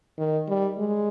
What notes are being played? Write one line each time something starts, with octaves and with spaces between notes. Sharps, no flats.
D#3
G3
G#3